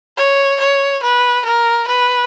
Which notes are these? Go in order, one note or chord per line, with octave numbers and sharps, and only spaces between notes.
C#5
C#5
B4
A#4
B4